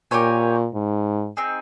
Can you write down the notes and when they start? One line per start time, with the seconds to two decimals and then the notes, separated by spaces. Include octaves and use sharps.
0.11 A#2 G4 A#4 C#5 G#5
0.74 G#2
1.37 C4 D#4 G#4